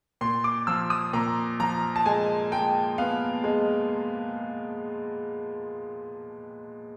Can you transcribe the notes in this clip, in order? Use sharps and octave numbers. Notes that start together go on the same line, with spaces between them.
A#2 C6
D6
F3 E6
D#6
A#2 A#5
F3 A#5
A5
G#3 G#5
G#3 G5
B3 F5
G#3